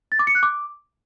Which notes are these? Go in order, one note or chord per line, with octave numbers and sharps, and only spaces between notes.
A6
D6
C#7
F#6
D6